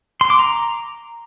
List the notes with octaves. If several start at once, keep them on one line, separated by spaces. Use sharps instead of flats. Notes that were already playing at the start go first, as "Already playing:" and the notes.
C6
D6
A#5